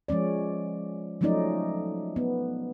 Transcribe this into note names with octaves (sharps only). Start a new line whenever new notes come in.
F3 G#3 C#4 D5
F3 F#3 A3 C#4 D#4 D5
B3